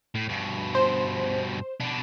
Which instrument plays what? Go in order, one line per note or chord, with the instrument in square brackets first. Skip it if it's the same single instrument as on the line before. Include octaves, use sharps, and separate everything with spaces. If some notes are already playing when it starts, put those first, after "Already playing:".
[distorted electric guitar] A2
G2 B2
[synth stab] C5
[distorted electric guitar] B2 D4